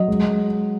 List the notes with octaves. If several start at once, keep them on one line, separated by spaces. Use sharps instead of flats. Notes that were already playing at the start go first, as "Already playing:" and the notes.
Already playing: F#3 D#5
G#3